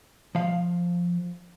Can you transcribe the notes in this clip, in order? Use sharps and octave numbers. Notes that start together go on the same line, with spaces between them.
F3 F5